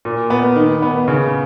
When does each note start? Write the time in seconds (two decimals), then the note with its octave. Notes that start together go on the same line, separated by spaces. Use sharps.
0.05 A#2
0.30 B3
0.56 D#3
0.82 B3
1.08 C#3